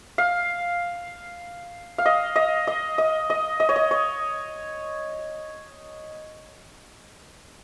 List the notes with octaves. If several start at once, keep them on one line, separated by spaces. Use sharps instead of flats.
F5
F5
D#5
D#5
D#5
D#5
D#5
D#5
C#5
D#5
C#5